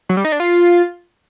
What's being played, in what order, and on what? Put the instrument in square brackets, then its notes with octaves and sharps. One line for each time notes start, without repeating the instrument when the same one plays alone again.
[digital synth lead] F#3
G3
D#4
D4
F4